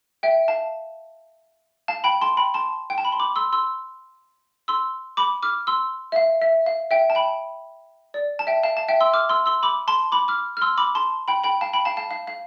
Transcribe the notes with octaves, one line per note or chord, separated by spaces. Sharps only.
E5 G5
F5 A5
F5 A5
G5 B5
A5 C6
G5 B5
A5 C6
G5
A5
B5
C6
B5 D6
C6 E6
C6 E6
C6 E6
B5 D6
D6 F6
C6 E6
E5
F5
E5
F5
E5 G5
A5
G5 B5
D5
A5
E5 G5
F5 A5
F5 A5
E5 G5
C6 E6
D6 F6
C6 E6
C6 E6
B5 D6
A5 C6
B5 D6
D6 F6
F6
C6 E6
B5 D6
A5 C6
G5 B5
G5 B5
F5 A5
G5 B5
F5 A5
F5 A5
F5
F5